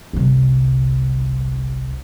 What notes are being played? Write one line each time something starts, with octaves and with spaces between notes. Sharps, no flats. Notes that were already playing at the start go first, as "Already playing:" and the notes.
G1 C2